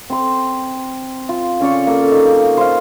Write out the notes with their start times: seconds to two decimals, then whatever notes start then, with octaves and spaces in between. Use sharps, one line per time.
0.10 C4 C6
1.29 F4
1.60 C#3 C#4 D5 C#6
1.87 A#3 A4
2.11 C#3 D#4
2.57 C5 F5